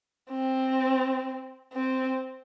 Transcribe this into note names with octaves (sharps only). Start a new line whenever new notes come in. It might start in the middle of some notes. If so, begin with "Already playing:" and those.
C4
C4